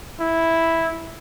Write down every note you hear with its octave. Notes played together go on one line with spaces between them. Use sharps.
E4